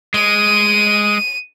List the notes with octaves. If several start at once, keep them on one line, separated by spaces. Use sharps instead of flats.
G#3 D#7